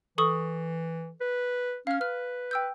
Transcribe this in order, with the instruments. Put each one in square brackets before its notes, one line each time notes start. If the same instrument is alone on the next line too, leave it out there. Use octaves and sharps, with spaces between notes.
[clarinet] E3 [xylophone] A4 C#6 D#6
[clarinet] B4
[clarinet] C#4 [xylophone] F5 F6
[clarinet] B4 [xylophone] F6
[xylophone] G5 E6 G6